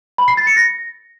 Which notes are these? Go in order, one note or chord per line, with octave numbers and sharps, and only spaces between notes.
B5
C7
A6
C#7
A#6